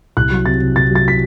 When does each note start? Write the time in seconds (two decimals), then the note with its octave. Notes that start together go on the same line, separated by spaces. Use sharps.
0.17 C2 F#6
0.31 F#3
0.46 C3 A6
0.61 C3
0.76 C3 A6
0.91 F#3 A6
1.08 B6